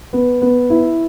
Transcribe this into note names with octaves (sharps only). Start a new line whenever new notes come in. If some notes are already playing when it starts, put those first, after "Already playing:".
B3
B3
E4